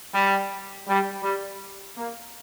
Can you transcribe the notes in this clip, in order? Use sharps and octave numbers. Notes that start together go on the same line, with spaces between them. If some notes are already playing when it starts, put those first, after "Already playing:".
G3
G3
G3
A#3